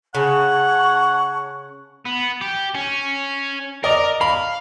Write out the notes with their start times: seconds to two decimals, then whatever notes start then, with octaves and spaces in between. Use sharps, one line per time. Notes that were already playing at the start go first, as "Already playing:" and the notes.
0.15 C#3 C#5 F#5 A5 C#6
2.05 B3
2.41 G4
2.75 C#4
3.84 A#4 D5 D#5
4.21 F5 B5